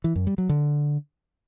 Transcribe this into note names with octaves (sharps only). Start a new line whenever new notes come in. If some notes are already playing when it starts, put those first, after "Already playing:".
E3
F#2
G3
F#3
D3